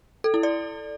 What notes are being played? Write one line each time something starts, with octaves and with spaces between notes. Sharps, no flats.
A4
E4
D5